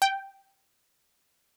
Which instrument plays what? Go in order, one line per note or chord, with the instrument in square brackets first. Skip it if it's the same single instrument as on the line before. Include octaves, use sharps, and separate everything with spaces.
[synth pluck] G5